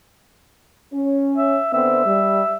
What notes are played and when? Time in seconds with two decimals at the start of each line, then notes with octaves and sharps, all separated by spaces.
0.93 C#4
1.37 E5
1.73 D3 B3 C4 E5
2.06 G3